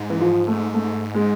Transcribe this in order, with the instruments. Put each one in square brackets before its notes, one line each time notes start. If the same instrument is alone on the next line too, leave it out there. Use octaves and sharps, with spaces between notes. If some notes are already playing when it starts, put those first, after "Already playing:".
Already playing: [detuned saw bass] G#2
[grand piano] E3
F3
A3
A3
G#3